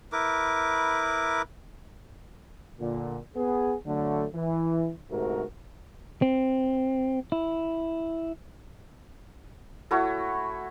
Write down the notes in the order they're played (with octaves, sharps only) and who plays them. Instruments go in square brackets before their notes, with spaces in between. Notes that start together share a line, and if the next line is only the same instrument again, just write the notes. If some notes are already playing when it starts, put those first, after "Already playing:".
[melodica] E4 A#4 B4 D6
[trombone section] A#2 D3
B3 G#4
D3 F#3 A3
E3
D2 G#2 C3 A3 F#4 A#4
[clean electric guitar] C4
E4
[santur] A3 E4 F#4 C#5